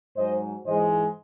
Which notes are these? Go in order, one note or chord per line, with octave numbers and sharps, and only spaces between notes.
G#2 F#3 C5 D#5
G#2 E3 G#3 C5 D#5